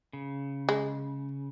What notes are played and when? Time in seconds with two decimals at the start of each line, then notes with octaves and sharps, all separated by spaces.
0.13 C#3
0.69 G#3